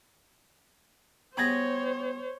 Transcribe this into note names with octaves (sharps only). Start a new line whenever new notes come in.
G3 B3 G#4 C5 C#5 B5 G#6 A#6